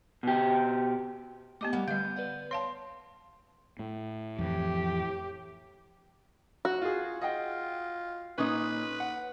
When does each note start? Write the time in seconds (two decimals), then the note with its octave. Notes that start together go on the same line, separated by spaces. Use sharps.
0.23 B2 G4
1.61 A3 B3 G4 D#5 A5 D6
1.73 G3 A#3 F#5
1.88 D3 G3 B3 D#5 F5 G6
2.16 B4 D5 F#5
2.51 C#5 F5 A5 C6
3.79 A2
4.39 F2 E3 G4
6.65 F#4
6.82 F4 G#4
7.22 F4 D#5 F#5 G5
8.38 A#2 C#4 D#4 B4 D#5
9.00 F#5